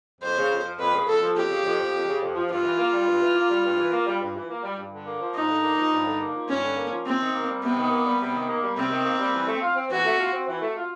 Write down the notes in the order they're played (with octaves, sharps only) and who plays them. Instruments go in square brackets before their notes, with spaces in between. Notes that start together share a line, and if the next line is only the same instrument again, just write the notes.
[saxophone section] F2 [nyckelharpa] C5
[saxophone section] C#3
F2
F3
[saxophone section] F2 [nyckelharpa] B4
[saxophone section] C#3
[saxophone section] F2 [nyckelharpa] A4
[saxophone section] F3
[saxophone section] F2 [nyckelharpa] G4
[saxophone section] C#3
F2
F3
F2
C#3
F2
F3
[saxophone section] G2 [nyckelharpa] F4
[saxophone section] E3
A#3
G3
G2
E3
A#3
G3
G2
E3
A#3
G3
G2
E3
A#3
G3
G2
D3
A#3
F3
[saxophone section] G2 [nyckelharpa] D#4
[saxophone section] D3
A#3
F3
G2
D3
A#3
F3
[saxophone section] G2 [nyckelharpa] C#4
[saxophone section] D3
A#3
F3
[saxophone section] C3 [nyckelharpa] C4
[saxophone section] D#3
A#3
G3
[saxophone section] C3 [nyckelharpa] B3
[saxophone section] D#3
A#3
G3
C3
D#3
A#3
G3
[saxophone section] C3 [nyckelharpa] C4
[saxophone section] D#3
A#3
G3
E3
A3
F4
C4
[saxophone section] E3 [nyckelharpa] F#4
[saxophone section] A3
F4
C4
E3
A3
F4